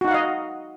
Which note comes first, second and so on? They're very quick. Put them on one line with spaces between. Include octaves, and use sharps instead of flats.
F#4 D#4 F#5 F5 D#5